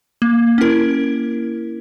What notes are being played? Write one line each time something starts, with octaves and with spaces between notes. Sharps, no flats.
A#3
C#4 E4 A#4